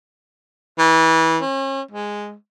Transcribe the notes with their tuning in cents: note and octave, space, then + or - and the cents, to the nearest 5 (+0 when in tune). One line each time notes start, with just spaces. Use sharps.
E3 -25
C#4 -40
G#3 -5